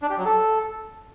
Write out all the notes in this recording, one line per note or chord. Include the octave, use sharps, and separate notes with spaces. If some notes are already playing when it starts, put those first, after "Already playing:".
D4
G4
F#3
A4